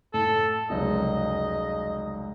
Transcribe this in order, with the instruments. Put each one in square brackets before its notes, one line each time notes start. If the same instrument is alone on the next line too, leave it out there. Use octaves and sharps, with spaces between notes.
[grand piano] A2 [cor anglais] A4
[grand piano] F1 C#2 F#2 [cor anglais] D#5